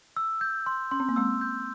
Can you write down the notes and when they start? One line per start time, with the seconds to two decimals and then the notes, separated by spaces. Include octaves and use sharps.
0.17 E6
0.41 G6
0.66 C6
0.91 C#4 C6
1.00 C4
1.09 A#3
1.16 G#3 C4 E6
1.41 G6